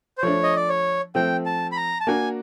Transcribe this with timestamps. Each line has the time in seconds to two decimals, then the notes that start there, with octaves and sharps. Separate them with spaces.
0.18 C5
0.22 F3 A3 D4 C#5
0.43 D#5
0.56 D5
0.69 C#5
1.15 F3 A3 C4 G5
1.46 A5
1.72 B5
1.77 A#5
2.00 A5
2.07 A#3 D4 F#4 G#5